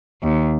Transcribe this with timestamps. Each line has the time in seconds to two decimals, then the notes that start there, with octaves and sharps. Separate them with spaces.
0.23 D#2